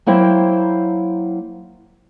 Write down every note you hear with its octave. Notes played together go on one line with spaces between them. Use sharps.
F#3 A#3 E4 C5 G5